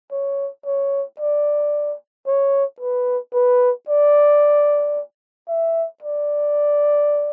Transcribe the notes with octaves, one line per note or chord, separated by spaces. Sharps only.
C#5
C#5
D5
C#5
B4
B4
D5
E5
D5